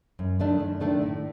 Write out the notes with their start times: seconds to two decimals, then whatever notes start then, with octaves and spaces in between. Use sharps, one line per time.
0.19 F#2
0.40 D#3 A3 D4
0.60 F#2
0.81 D#3 A3 D4
1.02 A2